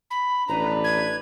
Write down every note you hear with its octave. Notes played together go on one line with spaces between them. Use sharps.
B5
A1 D4 B4 A#5
G#6